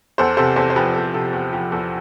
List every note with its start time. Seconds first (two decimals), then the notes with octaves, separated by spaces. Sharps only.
0.18 E2 A4 C5
0.37 C3 A4 C5
0.56 E2 A4 C5
0.70 C5
0.76 F3 G4 B4
0.96 E2 A4
1.14 C3 A4
1.33 E2
1.52 F3 G4
1.72 E2 A4